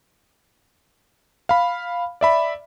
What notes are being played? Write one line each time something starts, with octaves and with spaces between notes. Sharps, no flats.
F5 B5
D5 E5 B5